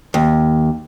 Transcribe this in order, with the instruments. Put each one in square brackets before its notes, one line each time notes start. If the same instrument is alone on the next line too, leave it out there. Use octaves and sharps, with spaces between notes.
[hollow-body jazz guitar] D#2